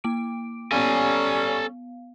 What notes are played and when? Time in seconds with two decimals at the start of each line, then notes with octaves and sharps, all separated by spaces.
0.04 A#3 D6 D7
0.72 G3 B3 C#4 A4 F5 G#5